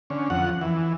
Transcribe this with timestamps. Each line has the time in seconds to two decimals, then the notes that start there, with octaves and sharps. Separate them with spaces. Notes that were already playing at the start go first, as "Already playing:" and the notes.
0.10 D3 C#4
0.30 F2 F#5
0.61 E3